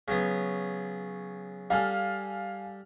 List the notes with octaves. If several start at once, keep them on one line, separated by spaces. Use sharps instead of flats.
C#3 F#3 B3
G3 A4 F5 G#5 F6